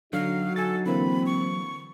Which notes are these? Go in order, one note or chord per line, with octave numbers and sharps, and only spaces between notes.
D3 F#3 D#4 F#4 F5
A4 G#5 A6
D3 E3 A#3 C4 B5
C#6